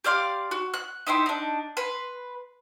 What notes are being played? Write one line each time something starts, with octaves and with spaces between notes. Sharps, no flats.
G4 D5 F5 C6
F#4
F#6
D#4 E4 G4 C6
D4 D#4
B4 C6